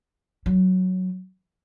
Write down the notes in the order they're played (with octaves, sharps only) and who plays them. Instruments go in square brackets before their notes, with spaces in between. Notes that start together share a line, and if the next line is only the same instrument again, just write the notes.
[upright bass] F#3